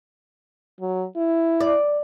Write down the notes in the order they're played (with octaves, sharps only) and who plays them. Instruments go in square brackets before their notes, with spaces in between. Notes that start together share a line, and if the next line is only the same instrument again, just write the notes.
[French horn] F#3
E4
[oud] D5